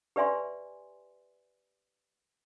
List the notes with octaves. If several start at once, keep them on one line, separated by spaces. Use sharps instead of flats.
G4 B4 D5 E5 G#5 C6